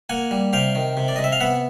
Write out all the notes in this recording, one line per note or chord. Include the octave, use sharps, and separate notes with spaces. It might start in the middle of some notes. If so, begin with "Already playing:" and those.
A#3 F#5 G#5
G3
C3 F5 G5
D#3
C3
D5
C3 D#5
E5
F5
B3 E5 F#5